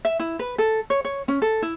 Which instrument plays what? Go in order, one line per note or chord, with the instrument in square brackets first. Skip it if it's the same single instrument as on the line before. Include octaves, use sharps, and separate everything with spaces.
[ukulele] E5
E4
B4
A4
C#5
C#5
C#4
A4
E4